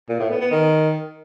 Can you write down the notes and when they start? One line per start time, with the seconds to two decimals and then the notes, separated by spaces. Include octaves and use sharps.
0.09 A#2
0.20 A2
0.30 B3
0.40 B3
0.51 D#3